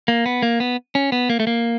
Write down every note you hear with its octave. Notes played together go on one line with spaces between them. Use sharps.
A#3
B3
A#3
B3
C#4
B3
A#3
A3
A#3